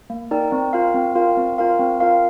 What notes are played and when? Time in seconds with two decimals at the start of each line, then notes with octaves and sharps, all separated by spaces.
0.10 A#3
0.31 D#4 A#4 D5 G5
0.52 C4
0.73 F4 A#4 F5
0.94 C4
1.15 F4 A#4 F5
1.37 C4
1.58 F4 A#4 F5
1.79 C4
2.00 F4 A#4 F5